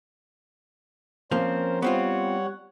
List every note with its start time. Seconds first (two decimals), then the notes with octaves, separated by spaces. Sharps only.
1.31 F3 A#3 C4 C#4 A#4 C5
1.82 G3 B3 C4 F4 C#5 F#5